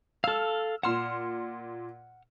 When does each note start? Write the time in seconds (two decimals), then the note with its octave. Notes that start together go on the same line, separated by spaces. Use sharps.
0.24 A4 F5 E6 F6
0.83 A#2 F#5 C6 F6 E7